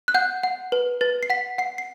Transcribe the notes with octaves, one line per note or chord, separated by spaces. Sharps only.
F#6
F#5 G6
F#5
B4
B4 A6
C7
F#5 B6
F#5 C7
C7